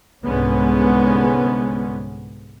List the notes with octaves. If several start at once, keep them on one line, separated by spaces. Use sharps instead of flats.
C2 G#2 D3 G#3 B3 C#4